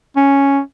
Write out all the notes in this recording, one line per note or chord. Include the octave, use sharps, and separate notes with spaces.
C#4